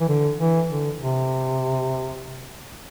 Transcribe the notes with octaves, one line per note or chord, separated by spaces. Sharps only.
E3
D3
E3
D3
C3